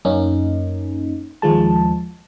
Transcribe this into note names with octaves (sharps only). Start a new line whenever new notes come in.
F#2 A#3 C#4 D#4
D#2 F3 G#3 A5